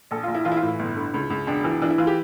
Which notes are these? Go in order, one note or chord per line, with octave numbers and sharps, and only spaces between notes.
A#1 A4
A#1 F4
E4
E3 F4
E4
F4
A2
E4
G1
D3
C#2
C#2
E1 D4
E3
E3 D4
E4
E3 F4
G4